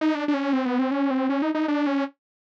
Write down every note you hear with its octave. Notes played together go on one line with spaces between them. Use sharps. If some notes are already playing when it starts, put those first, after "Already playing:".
D#4
D4
D4
C#4
C4
B3
C4
C#4
C4
C#4
D#4
D#4
D4
C#4